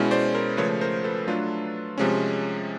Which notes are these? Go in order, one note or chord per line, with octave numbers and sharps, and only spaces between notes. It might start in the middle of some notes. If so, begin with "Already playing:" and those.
Already playing: B2 G#3 C#4 E4
C5 D5
A#4 C5
C#3 F3 A3 B4 C#5
A#4 C5
A4 B4
F#3 A3 D4 F4
C3 F3 G#3 C#4